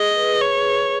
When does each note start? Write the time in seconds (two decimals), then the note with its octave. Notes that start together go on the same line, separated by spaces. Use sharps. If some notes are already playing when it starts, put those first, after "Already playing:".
Already playing: G#4 D#5
0.16 B4
0.41 C#5